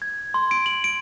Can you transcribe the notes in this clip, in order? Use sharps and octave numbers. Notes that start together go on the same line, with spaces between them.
G#6
C6
D7
F#7
D7